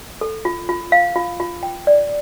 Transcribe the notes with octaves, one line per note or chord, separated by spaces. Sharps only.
A4
F4
F4
F5
F4
F4
G5
D5